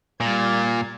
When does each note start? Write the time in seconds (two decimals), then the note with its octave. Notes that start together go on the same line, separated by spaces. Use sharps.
0.20 A#2 G3 G#6 A6